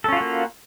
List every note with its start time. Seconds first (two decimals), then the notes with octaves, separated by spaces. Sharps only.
0.04 A4
0.08 C#4
0.12 F4
0.17 F#4
0.21 A#3